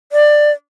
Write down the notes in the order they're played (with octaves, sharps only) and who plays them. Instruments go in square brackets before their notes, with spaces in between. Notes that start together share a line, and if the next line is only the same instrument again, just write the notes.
[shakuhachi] D5